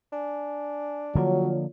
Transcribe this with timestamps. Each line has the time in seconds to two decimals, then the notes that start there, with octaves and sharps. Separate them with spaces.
0.13 D4 G#5
1.15 D3 F3 F#3 A#3 F4 C#5